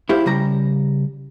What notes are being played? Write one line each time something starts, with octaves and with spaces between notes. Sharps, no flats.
E4 G4 C5 F5
C#3 G3 A#5